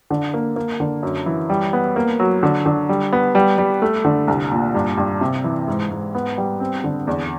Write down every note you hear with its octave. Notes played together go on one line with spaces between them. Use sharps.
D3
A#3
A#3
D3
F#2
E3
G3
B3
A#3
F#3
D3
D3
G3
B3
G3
G3
A3
D3
C2
A#2
G2
G2
C3
E3
G#2
G#2
B3
G3
C4
D3
E2